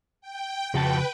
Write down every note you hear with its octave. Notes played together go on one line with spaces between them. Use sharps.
G5
F2 C#3 F#4 B4 G5 A5